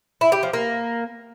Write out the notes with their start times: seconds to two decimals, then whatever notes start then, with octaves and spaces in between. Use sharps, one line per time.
0.21 E4
0.32 G4
0.43 F3
0.53 A#3